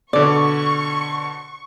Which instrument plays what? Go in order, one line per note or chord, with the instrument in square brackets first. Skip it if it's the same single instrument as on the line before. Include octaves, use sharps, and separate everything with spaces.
[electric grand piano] B2 D3 [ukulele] D5 [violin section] C#6